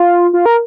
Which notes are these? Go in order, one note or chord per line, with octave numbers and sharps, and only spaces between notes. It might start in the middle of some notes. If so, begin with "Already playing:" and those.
Already playing: F4
F4
A#4